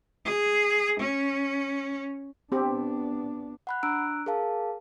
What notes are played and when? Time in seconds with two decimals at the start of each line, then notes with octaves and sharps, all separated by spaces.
0.25 G#4
1.00 C#4
2.52 B3 C4 D4 G4
3.67 F#5 B5 F#6
3.83 D4 A#5 E6 F#6 D7
4.26 G#4 A#4 F5 A5